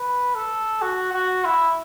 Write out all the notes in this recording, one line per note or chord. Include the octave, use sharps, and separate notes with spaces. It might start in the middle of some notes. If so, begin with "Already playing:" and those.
Already playing: B4
A4
F#4
F#4
E4